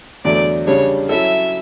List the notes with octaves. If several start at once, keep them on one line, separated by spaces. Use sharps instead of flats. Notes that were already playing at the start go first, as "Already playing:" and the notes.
E2 D3 F#3 A3 D5
C#3 G3 D4 C#5
F#3 C#4 E4 A4 E5